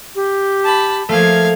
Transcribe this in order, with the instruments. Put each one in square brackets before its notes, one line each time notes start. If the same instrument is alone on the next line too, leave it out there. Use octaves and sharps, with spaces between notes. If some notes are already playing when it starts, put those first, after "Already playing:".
[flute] G4
[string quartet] A5 B5
[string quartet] F3 F5 G#6 [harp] A3 A#3